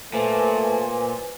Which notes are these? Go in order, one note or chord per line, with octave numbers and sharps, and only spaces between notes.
A#2 A3 B4 C5 G#5